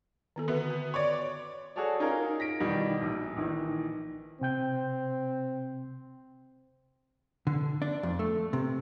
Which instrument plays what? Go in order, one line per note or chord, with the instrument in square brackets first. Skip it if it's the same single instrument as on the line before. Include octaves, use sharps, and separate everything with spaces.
[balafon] D#3 B3 A4
[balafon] D3 F#4 E5 [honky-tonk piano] B3
[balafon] B4
[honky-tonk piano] C#5 D5
[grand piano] F#4 G#4 A4 C#5 D5
C#4 D#4 F4 G#4 A#4
A#6 B6 D7
B2 D#3 E3 G3
A#1
A#1 D#3 E3
[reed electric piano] C3 G5 G6 [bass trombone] C4
[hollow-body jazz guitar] D3
D4
F2
A3
C3